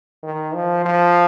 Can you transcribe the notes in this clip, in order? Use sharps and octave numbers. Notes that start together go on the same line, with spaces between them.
D#3
F3
F3